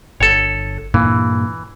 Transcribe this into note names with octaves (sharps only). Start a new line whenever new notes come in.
G1 A4 C#5
G2 A#2 E3 A#3